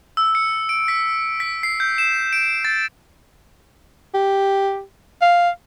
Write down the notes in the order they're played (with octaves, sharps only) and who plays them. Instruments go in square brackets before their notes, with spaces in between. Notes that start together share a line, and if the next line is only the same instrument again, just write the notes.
[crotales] E6
C#7
D7
B6
B6
C7
G6
E7
D7
A6
[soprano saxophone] G4
F5